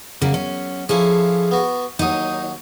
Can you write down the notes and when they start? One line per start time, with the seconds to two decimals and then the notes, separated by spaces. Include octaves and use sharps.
0.22 F#2 C#3 A#3 A#4
0.34 C#4
0.89 F3 C#4 E4 G#4 A4 F5
1.51 B3 F#4
1.99 D#2 F#3 D#4 D#5 D#6